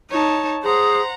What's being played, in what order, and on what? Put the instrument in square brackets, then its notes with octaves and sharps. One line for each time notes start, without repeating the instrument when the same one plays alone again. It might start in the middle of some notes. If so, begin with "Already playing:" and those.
[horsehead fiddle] D#4 [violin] C#5 A5
[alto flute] G#4 [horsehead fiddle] C5 [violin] F#5 A#5